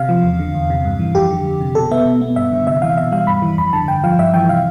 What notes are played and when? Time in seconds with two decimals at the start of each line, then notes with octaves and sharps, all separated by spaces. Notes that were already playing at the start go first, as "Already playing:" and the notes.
Already playing: C3 F5
0.09 F3
0.23 E2
0.39 D3
0.55 E2
0.70 C3
0.85 G2
0.99 E3
1.15 F2 G4
1.30 D3
1.46 F2
1.61 C3
1.75 B2 A4
1.91 B3 E5
2.06 B2
2.21 B3
2.36 G2 E5
2.52 D3
2.67 C3 E5
2.82 E3 F5
2.97 B2 E5
3.12 G3 F5
3.27 G2 B5
3.42 E3
3.58 F2 B5
3.73 D3 A5
3.88 G2 G5
4.04 F3 F5
4.18 G2 E5
4.34 E3 G5
4.49 C3 F5